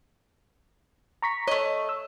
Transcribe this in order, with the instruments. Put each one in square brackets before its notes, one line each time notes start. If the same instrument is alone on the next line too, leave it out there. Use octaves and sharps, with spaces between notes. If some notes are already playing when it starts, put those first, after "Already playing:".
[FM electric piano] A#5 C#6 B6
[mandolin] A3 D#5 [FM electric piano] C#5
[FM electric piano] E6